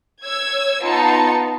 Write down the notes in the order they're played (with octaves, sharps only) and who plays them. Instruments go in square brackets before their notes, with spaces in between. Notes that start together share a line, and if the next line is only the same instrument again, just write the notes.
[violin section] C#5 E6 G#6
B3 D#4 F4 A5 C#7